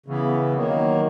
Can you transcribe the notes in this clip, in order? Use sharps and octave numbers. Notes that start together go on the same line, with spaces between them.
C#3 E3 B3
D#3 F#3 A#3